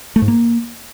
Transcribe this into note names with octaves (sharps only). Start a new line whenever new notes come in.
A3
G#2
A#3